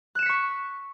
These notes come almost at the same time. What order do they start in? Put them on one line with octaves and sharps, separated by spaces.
F#6 E7 C#7 B6 C#6